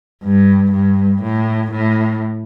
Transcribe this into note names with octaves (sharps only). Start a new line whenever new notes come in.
G2
G2
A2
A2